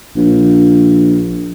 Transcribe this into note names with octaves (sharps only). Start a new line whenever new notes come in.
A#1